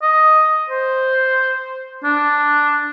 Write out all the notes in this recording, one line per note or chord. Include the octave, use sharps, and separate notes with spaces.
D#5
C5
D4